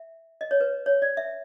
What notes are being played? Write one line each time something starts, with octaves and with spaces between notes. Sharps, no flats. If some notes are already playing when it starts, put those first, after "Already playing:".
Already playing: E5
D#5
C#5
B4
C#5
D5
E5